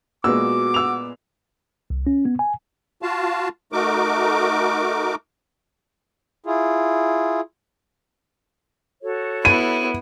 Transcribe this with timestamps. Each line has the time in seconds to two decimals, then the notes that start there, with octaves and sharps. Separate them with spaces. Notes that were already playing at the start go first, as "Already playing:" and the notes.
0.24 A#2 G#3 B3 F#4 D6 E6
0.74 E6 F7
1.90 C2
2.07 C#4
2.25 B3
2.39 G#5
3.02 F4 F#4 F5 A5
3.72 A3 D#4 F#4 A#4 D6
6.46 E4 F4 G#4
9.02 F#4 A4 C#5
9.45 B3 E4 D#7